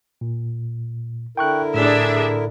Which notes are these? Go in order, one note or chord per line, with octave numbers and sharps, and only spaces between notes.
A#2
D3 E4 A#4 G5 C#6 F#6
A2 D4 G#4 E5